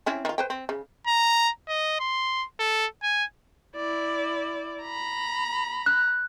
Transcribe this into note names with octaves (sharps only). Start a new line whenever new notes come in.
C4 C#4 E4
D#3 F4
B4 C5 G5
C4
C#3
A#5
D#5
C6
A4
G#5
E4 D5
A#5 B5
F#6